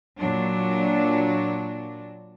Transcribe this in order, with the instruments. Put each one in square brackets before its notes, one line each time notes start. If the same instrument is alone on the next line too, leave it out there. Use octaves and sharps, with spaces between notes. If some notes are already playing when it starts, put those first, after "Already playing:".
[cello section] A#2 F#3 D4